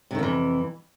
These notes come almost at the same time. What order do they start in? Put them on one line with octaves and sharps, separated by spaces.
C3 D#3 F2 E3